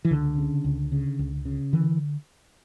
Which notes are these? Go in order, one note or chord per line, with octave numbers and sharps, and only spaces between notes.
E3
C#2 D3
C#3
C#2
C#3
C#2
C#3
D3 E3